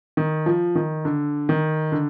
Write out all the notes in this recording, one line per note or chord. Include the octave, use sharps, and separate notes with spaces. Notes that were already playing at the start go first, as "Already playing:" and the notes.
D#3
F3
D#3
D3
D#3
D3